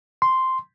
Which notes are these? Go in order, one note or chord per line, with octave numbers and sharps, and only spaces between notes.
C6